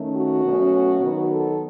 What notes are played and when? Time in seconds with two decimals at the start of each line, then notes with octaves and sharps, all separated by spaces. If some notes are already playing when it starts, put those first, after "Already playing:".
Already playing: D#3 A3 C#4
0.15 F#4
0.44 B2 F#3 A3 C#4
1.01 D#3 F#3 B3
1.30 A4